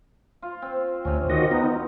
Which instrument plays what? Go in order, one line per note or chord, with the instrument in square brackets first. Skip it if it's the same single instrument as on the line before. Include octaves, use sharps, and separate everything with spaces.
[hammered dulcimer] F4
C4
[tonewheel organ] D2 [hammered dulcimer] C3 C#4
[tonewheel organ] D#3 F#4 D#5 [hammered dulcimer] G4
[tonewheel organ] B3 D#4